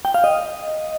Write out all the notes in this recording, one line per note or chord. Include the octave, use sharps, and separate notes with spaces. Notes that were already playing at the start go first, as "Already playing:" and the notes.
G5
F5
D#5